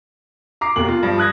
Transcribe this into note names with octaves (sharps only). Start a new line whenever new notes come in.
A#5 D6 C7
F1 D#2 B2 F#7
F4
G2 F3
D#6 F#6 G#6 A#6